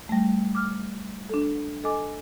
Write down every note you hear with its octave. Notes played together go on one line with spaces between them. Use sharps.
G3 A3
D6 F6
D4 A4
A4 D#5 G#5 D6